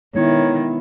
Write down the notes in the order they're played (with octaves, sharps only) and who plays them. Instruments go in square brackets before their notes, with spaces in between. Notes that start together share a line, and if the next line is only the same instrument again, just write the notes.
[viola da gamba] D#3 [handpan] G#3 B3 E4 [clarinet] C#5